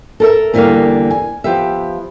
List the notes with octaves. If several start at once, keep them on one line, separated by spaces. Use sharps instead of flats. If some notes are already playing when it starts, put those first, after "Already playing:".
A4 A#4 E5
E2 D3 E3 G3 A#3 F5
G#5
F3 B3 G4 E5